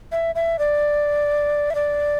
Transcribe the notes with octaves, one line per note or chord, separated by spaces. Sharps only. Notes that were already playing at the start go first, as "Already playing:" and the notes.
E5
E5
D5
E5
D5